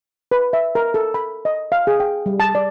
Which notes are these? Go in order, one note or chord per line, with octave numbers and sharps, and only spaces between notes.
B4
E5
A#4
A4
B5
D#5
F5
G#4
G5
G3
A5
D5